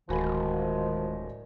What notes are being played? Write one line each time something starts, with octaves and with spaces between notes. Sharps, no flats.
D1 D#3 F3 G#3 F#4 G#5 B5